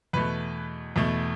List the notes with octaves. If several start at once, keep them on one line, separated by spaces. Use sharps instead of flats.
E2 B2 A3 B4
E2 B2 A3